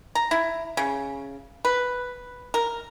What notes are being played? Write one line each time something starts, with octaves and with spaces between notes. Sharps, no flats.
A#5
E4
C#3
B4
A#4